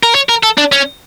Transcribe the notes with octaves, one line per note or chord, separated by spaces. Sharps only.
A#4
C#5
A#4
A4
D4
C#4